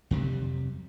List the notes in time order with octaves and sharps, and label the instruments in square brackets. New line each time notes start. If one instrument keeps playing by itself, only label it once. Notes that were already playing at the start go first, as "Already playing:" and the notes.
[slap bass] F2 C3 F#3 G3